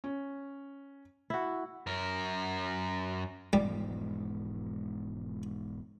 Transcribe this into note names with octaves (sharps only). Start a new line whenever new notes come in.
C#4
E4 F#4
F#2 A#4
E1 G#2 F3 G3